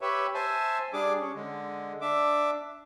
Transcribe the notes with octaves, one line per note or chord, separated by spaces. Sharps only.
G4 B4 C#5 E5
C5 E5 G#5 A5
G3 D4 G#4 D6
C#4
D3 G#3
D4 E5 D6